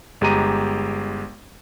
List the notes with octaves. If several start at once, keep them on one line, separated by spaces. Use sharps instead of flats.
G1 G#3 G4 A#5 D#7